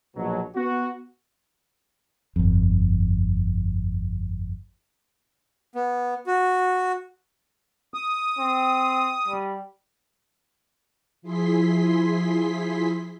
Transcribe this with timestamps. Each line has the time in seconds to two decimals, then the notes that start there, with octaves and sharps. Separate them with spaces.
0.16 A#1 B2 F#3
0.56 B3 F#4
2.36 G1 F2
5.75 B3
6.27 F#4
7.94 D#6
8.39 C4
9.28 G3
11.22 F3 E4 G#4 C6 B6